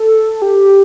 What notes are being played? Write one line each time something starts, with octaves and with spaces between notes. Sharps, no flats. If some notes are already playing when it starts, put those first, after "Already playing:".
Already playing: A4
G4